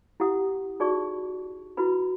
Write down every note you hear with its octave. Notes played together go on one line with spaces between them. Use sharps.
E4 G4 F#5 D#6
D#4 F#4 G#4 D5 A5 C#6
E4 F#4 B4 B5